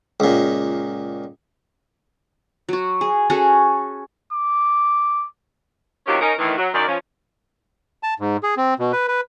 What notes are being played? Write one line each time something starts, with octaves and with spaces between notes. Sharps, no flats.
C#2 A#2
F#3 F#4
G#4
C#4 F#4 G#4 A4
D6
C3 D#3 F#3 C#4 F4 G4
C#4 D#4 A#4
A2 D#3 E3
F#3
F#2 D#3 D5
F3 C#4
A5
G#2
G#4
C4
B2
B4
B4